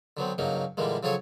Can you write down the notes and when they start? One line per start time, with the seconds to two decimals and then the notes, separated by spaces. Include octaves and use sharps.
0.17 D3 F#3 B3 C4
0.38 G2 C#3 F#3 A#3 D#4
0.77 A#2 D3 E3 G3 G#3 A#3
1.03 C#3 F3 F#3 G#4 A4 C#5